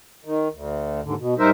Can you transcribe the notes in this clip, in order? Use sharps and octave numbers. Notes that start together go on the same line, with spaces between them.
D#3
D2
D#2 G#2 D3
B2
G#2 G3 D#4 A#4 C5 E5